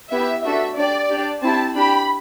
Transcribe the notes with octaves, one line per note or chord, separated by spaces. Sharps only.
B3 E4 G4 E5
A3 D4 F#4 A4 E5
D4 G4 D5
D4 G4
C4 E4 G4 A5
D4 G4 B5